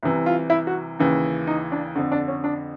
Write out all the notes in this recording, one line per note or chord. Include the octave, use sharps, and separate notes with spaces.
C2 C3 E3
F4
E4
F#4
D#2 C#3 E3
D#4
D4
F2 D3
D4
C#4
D4